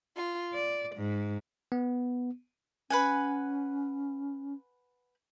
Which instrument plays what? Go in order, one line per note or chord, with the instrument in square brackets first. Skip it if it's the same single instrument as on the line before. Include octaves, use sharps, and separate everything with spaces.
[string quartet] F4
D5
G#2
[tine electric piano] B3
[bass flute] C#4 [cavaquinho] B4 F#5 G#5